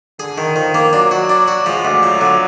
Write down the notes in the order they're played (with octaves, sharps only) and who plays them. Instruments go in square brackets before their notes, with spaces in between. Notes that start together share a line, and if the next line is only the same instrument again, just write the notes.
[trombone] D3 [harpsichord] G#4
[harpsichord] D#3
[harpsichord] D#3 [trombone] F3
[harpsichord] A#3
[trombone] F#3 [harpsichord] D4
[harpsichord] F#4
D4
F#4
[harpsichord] F3 [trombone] G#3
[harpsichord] D2
[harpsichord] F3 [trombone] F#3
[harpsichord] D3